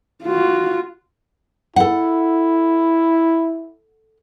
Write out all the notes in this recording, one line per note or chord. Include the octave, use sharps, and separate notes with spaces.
F4 F#4
E4 A4 F#5